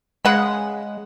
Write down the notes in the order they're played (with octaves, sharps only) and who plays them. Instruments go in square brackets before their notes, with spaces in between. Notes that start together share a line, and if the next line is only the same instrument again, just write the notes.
[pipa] C#3 F#5 B5 [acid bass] G#3